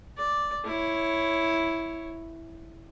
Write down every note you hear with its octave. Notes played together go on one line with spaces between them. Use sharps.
D5
E4 C#5